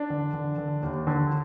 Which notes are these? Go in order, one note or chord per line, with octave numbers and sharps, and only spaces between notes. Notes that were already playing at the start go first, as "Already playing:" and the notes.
Already playing: D4
D3
D3
D3
D#2
D3